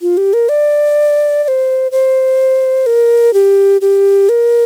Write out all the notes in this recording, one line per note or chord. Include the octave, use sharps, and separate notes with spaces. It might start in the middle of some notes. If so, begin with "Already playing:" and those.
F4
G4
A#4
D5
D5
C5
C5
A#4
G4
G4
A#4